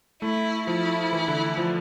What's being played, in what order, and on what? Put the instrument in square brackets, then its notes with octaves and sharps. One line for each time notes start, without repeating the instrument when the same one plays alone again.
[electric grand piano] A3 [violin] E4
[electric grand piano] F3 [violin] E4
[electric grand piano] E3
D3
F3